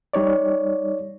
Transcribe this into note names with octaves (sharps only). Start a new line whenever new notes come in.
G3 D#4 C#5 D5